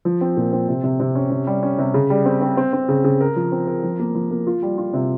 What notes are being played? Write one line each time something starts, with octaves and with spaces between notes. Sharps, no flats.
F3
C4
A#2
C4
C3
C3
C3
C#4
C3
G3
C#4
C3
C#3
G3
C4
C4
C4
C4
C#3
C#3
A#4
F3
C4
A#4
F3
A#3
F3
A#3
F4
G3
F4
C3